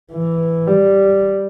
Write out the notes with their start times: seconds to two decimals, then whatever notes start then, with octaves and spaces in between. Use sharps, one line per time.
0.12 E3
0.67 G3